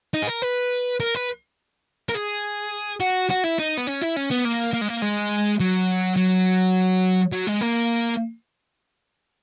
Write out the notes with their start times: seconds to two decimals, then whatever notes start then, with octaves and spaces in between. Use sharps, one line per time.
0.14 D#4
0.23 G#4
0.27 A#4
0.42 B4
1.00 A#4
1.15 B4
2.09 A#4
2.15 G#4
3.00 F#4
3.30 F#4
3.44 E4
3.59 D#4
3.77 B3
3.87 C#4
4.01 E4
4.16 C#4
4.30 B3
4.45 A#3
4.73 A#3
4.81 G#3
4.88 A#3
5.02 G#3
5.60 F#3
6.16 F#3
7.32 F#3
7.47 G#3
7.61 A#3